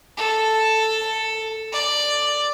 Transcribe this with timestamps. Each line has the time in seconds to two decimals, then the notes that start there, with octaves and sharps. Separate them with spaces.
0.17 A4
1.72 D5